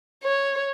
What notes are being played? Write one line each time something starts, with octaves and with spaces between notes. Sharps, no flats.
C#5